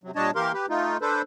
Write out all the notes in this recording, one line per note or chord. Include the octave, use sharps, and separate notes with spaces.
C3 F#3
A#2 G3 D4 C#5 D#5 A5
E3 A#3 G4 A#4 F5 C6
G4 B4
A3 D#4 F4
D4 A4 B4 C5